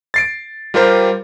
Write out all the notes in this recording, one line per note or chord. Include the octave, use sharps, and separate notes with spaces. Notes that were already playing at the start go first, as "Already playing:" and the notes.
A6 C7 D7
G3 F4 G4 A#4 C5